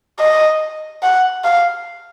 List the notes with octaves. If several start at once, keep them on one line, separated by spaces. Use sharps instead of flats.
D#5
F#5
F5